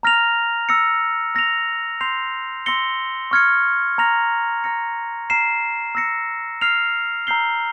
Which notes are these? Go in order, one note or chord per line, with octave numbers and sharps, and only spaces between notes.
A#5 F6 A#6 F7
E6 A#6 C#7
E6 A#6 F7
C6 G6 C7 F7
C6 E6 A#6 C#7 G7
C#6 F6 G#6 C#7
A#5 F6 A#6 F7
A#5 F6 A#6 C#7
A#5 F6 C7 E7
E6 A#6 C#7
F6 C7 F7
A#5 E6 G6 C7 G7